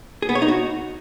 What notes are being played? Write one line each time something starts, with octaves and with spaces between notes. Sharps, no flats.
G#4
B3
C#5
D#4
F#4